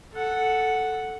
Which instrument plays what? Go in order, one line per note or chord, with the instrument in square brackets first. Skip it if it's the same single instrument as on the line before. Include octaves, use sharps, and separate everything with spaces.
[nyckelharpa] A4 F#5